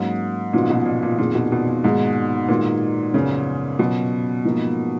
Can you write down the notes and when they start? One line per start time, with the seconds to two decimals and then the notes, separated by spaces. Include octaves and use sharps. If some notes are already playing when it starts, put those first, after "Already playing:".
Already playing: G#2 F#3 A#3 C#4
0.53 A#2 C#3 F3 B3 D#4 F#4
0.70 B2
0.86 A#2
1.03 A#2
1.18 F2 A#2 D#3 A#3 F4 G#4
1.35 B2
1.52 B2
1.68 A#2
1.84 G#2 D#3 G#3 D#4 G#4
2.48 A#2 D#3 G#3 B3 F#4 A#4
3.14 F#2 C#3 F3 B3
3.79 B2 F#3 C#4 F4
4.45 G#2 F3 A#3